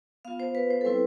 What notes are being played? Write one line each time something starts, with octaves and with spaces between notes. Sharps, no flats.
B3 F4 F5
C5
B4
C5
A4
G3 C4 E4 B4